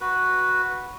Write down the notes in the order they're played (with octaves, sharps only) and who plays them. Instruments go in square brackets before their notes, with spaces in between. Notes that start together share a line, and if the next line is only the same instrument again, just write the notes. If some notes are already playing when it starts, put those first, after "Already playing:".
[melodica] F#4 B4